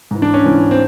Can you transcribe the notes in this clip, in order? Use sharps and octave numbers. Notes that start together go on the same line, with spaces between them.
G#2 E3
D4
C#4
G#2 E3
C4